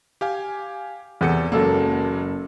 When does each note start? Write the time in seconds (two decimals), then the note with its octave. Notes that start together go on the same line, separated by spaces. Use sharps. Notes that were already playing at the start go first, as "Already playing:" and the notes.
0.21 G4 F5 G#5
1.21 E2 C3 A4 C#7
1.52 F#1 F#3 G#3 A#3 A4 A5